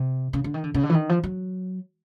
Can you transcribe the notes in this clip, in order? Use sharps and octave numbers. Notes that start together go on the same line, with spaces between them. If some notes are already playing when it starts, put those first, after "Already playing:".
Already playing: C3
C#3
D3
D#3
D3
C#3
D3
E3
D#3
F3
F#3